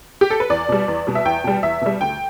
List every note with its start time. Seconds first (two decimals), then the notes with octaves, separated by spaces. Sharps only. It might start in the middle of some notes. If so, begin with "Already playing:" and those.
0.21 G4
0.30 A4
0.40 B4
0.50 E2 D5
0.69 B2 G3
0.88 E2
1.07 B2 G3
1.15 E5
1.25 E2 G5
1.44 B2 G3
1.63 E2 E5
1.81 B2 G3
2.01 D2 G5